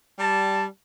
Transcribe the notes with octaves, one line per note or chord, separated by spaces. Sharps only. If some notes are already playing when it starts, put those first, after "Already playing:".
G3 A5